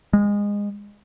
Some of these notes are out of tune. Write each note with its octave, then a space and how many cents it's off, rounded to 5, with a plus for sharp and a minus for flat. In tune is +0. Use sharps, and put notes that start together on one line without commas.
G#3 -20